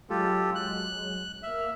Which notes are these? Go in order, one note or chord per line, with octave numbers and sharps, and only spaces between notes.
F#3 G#3 F4 G4 A4
F#6
A#3 E5 F6